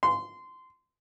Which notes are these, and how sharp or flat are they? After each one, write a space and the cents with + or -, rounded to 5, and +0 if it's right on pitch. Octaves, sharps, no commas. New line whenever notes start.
C6 -20